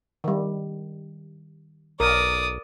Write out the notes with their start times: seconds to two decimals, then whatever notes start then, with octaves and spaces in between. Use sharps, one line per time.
0.24 D#3 G3
2.00 B1 A#4 D5 D#6